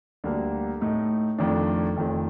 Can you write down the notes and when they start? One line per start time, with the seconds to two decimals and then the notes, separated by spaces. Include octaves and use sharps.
0.24 D2 D3 G3 A#3
0.81 A2 A3 D#4
1.38 F2 D#3 A3 D4
1.96 F1 F2 D#3 A3